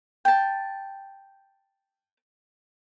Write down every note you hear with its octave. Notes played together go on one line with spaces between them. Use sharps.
G5 A5